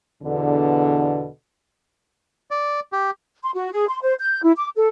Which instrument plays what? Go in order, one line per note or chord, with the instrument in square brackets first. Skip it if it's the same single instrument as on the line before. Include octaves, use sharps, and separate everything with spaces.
[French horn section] E2 B2 D3
[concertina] D5
G4
[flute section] C6
F#4
G#4
C6
C5
G6
E4
D6
A4